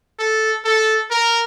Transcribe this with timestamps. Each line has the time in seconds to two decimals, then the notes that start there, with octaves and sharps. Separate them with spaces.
0.19 A4
0.65 A4
1.11 A#4